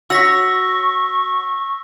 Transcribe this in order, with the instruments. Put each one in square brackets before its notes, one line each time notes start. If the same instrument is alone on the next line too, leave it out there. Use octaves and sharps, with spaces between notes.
[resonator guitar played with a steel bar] F#4 C#5 [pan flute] C#6 [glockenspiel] E6 A#6 B6